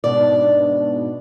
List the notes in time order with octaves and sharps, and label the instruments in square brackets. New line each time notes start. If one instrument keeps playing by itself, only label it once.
[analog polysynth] G#2 B2 D4 [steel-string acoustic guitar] D5